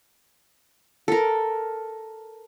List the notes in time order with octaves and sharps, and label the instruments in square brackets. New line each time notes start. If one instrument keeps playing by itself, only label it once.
[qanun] A4 A#4